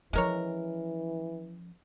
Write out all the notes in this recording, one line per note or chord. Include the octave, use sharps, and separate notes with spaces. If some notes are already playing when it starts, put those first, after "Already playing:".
E3 F3 G#3 C#4 A#4 C#5